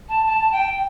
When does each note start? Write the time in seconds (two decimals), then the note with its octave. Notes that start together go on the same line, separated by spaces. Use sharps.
0.09 A5
0.26 A5
0.52 G5